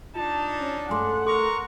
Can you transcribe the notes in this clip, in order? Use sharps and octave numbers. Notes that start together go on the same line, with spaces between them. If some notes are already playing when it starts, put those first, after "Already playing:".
D4 D#4 F4 A5
C#4
G2 G#3 A3 F#5 G#5 C6 D6
A4 A#4 A#5 C6 C#6